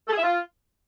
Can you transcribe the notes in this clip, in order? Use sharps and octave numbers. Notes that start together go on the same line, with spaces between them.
A4
G#4
E5
F4